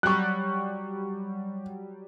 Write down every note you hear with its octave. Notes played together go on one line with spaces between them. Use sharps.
F#3 G3 C#6 F#6